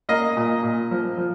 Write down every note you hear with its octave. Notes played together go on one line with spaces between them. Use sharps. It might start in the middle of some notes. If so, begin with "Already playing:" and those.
A#3 D#5
A#2
A#2
F3
F3